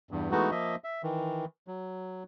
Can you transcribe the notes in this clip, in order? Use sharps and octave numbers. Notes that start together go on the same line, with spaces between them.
E2 G2
E3 G#3 A3 B3 D#4 F#4
F3 A#3 D#5 E5
E5
D#3 E3
F#3